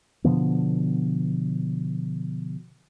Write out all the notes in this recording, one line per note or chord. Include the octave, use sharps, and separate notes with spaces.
B2 D3 F3 B3